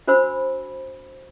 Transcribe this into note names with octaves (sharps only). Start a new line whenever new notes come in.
D4 F#4 C5 B5 E6